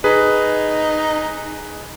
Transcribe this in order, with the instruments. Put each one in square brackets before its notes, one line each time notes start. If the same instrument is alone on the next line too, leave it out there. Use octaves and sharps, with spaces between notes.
[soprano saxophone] D#4 [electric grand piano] G#4 B4